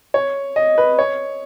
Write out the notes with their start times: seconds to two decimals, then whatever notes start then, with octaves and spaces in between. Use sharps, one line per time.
0.14 C#5
0.56 D#5
0.78 B4
0.99 C#5